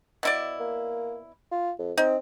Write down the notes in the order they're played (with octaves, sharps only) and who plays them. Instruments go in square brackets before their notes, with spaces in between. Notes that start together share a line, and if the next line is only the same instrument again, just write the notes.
[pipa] B2 E4 D5
[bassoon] A#3
F4
F2
[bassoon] C4 [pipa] D#4